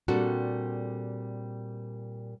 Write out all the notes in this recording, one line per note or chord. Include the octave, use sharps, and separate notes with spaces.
A#2 G3 C4 D4 F#4 A4